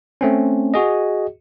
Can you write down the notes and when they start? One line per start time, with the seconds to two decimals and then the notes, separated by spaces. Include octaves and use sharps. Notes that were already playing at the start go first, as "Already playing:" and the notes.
0.21 A3 C4 C#4
0.74 F#4 G#4 D#5